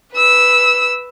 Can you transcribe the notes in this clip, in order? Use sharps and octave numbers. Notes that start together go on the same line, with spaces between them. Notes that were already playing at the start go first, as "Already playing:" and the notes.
B4 E6